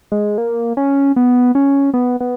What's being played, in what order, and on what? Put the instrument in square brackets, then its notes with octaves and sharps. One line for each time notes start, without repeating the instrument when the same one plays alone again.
[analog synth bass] G#3
A#3
C#4
B3
C#4
B3
B3